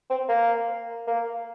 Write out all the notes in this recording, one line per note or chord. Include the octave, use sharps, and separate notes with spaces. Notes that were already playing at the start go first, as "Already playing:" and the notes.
C4
A#3
A#3